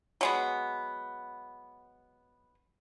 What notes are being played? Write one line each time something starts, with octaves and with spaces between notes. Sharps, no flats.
F#3 G#3 B3